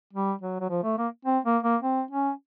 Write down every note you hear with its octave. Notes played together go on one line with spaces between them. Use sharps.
G3
F#3
F#3
F3
A3
A#3
C4
A#3
A#3
C4
C#4